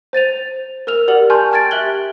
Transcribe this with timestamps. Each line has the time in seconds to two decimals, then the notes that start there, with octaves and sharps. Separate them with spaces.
0.13 C5 A6 D#7 F7
0.87 A#4 E6 F6 F7
1.08 G4 A#4 D5 F#5 F#7
1.30 G#5 A5 C6 C#6 F6 G6
1.51 G5 A5 F6 G#6 A6 D7
1.71 G4 E5 F#6 F#7 G7